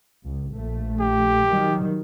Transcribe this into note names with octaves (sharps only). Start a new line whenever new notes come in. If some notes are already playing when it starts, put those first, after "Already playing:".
C#2
A#1 A3
G4
D#3 F#3 G3